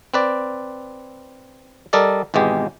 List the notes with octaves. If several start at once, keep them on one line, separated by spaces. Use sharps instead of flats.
C4 B4 D5
G3 A4 A#4 D5 D#5
G#1 E2 B2 G#3 G4